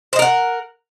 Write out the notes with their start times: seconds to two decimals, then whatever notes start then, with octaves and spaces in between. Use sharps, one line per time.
0.13 C5
0.16 D#5
0.19 A#4
0.22 F#5